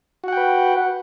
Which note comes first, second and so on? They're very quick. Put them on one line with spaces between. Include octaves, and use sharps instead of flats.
F#4 F#5 G5 B4